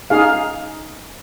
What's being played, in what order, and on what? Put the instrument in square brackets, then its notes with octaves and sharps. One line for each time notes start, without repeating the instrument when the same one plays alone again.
[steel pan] D#4 G#4 F5